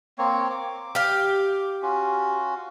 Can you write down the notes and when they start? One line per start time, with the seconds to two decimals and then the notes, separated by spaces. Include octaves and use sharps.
0.18 A#3 C4 C#5
0.50 D6
0.95 G4 F5
1.82 C#4 F4 F#4